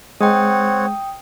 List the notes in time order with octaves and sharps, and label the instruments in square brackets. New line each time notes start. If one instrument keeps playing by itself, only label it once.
[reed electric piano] G#3 [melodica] C4 C#5 F#5 [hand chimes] G5 D#6